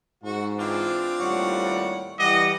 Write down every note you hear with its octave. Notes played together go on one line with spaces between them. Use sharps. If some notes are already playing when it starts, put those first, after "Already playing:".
G#2 F#4
E3 C4 D4 F4
D#2 A2 G3 C#5 F#5
E3 G3 D#5 F#5 D6